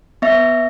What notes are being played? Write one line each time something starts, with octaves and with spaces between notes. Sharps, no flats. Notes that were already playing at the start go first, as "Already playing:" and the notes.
B3 E5